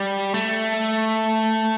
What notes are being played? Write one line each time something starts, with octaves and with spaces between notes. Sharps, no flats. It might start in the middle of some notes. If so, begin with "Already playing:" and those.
Already playing: G3
A3